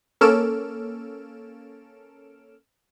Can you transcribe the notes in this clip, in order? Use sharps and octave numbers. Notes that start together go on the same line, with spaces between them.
A#3 C#4 A4 F6 D7 E7